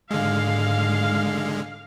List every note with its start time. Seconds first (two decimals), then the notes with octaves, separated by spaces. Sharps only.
0.11 G#2 D3 G#3 F5